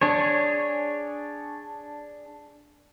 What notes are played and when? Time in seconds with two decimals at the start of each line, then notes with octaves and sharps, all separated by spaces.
0.01 D4 G#4 C#5